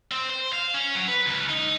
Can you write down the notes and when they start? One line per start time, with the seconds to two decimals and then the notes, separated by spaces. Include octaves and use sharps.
0.12 C4
0.30 C5
0.53 F5
0.74 C#4
0.95 F#3
1.08 B4
1.27 C#2
1.50 D#4